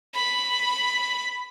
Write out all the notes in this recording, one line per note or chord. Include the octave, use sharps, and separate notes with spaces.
B5